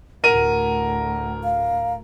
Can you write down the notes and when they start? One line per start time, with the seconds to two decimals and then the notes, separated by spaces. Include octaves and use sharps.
0.24 D2 A2 A#4 F#5 D#7
1.44 F5